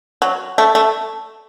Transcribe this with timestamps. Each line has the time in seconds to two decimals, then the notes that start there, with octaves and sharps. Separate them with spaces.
0.22 F#3
0.58 A3
0.75 A3